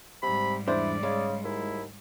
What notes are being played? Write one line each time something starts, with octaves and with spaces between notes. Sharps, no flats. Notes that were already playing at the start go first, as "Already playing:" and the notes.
G#2 C3 G3 B5
E2 D4 E4 C5 D5
C#3 G#3
D#2 E4